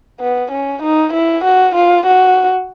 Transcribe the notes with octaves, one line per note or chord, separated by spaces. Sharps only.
B3
C#4
D#4
E4
F#4
F4
F#4